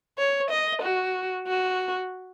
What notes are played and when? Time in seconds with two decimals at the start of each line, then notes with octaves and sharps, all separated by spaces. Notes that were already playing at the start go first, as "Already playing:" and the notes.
0.18 C#5
0.50 D#5
0.82 F#4
1.47 F#4